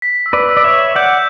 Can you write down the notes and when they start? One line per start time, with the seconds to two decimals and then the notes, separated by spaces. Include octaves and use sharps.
0.02 B6
0.26 E6
0.33 B4 D5
0.49 E6
0.57 D5
0.64 C#5 E5
0.72 E7
0.95 D5 F#5 G6